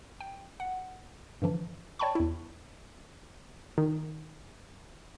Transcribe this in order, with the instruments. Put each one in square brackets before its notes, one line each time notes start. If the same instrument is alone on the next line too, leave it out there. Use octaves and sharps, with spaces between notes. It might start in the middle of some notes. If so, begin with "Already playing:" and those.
[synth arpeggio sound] G5
F#5
G2 D3 E3 F3
C#5 D5 G5 A5 B5 C#6
E2 E4
[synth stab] D#3